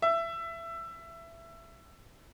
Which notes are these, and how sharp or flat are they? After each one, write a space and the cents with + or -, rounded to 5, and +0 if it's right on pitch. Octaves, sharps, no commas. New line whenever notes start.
E5 +20